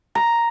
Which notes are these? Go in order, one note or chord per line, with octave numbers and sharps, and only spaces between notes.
A#5